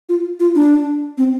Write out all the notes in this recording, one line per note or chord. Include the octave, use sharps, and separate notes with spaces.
F4
F4
D4
C4